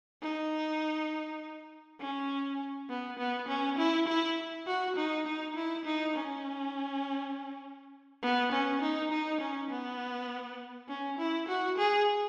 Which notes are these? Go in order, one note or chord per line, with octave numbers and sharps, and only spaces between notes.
D#4
C#4
B3
B3
C#4
E4
E4
F#4
D#4
D#4
E4
D#4
C#4
B3
C#4
D#4
D#4
C#4
B3
C#4
E4
F#4
G#4